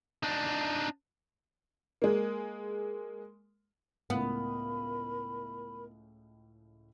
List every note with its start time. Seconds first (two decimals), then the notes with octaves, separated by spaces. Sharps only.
0.23 D4 D#4
2.02 G#3 A#3
4.10 C#2 A2 B3 A#4 F5 B5